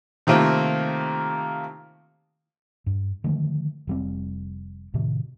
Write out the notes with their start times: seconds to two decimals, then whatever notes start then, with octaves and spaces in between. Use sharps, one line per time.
0.27 C3 D#3 A3 A#3 C4 F4
2.86 G2
3.24 D3 D#3 F3 A3
3.87 F1 G3 C4
4.94 A2 C3 D#3